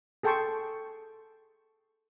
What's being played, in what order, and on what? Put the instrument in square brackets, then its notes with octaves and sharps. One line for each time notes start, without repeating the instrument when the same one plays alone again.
[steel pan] G#4 A4 G5 A5 C6 C#6